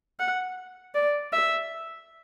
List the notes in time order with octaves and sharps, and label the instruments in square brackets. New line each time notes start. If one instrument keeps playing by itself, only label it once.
[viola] F#5
D5
E5